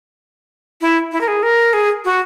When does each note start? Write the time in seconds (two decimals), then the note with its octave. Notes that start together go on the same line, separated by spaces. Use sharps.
0.81 E4
1.12 E4
1.21 A#4
1.28 G#4
1.43 A#4
1.73 G#4
2.05 F#4